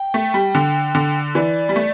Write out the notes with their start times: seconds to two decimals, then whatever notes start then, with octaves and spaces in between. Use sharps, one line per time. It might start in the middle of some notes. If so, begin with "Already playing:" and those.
Already playing: G5
0.14 A3
0.34 G3
0.55 D3
0.95 D3
1.35 E3 D5
1.69 G3
1.76 A3